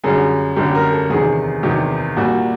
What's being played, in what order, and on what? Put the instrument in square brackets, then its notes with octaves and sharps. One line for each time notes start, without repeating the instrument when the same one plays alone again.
[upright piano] F#2 D3 G3 G#4
F#2 D3 G3 G4
A#4
A4
E2 C3 D#3 G#4
E2 C3 D#3 G4
A#2 G3 F#4